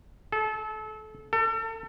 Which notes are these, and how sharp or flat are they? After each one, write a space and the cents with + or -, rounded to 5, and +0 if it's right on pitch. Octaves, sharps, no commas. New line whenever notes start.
A4 -30
A4 +35